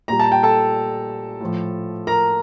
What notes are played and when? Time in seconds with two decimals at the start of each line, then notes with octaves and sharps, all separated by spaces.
0.08 A#2 G3 A#5
0.19 A5
0.32 G5
0.43 A4 A5
1.41 A2 F3
2.07 A#4 A#5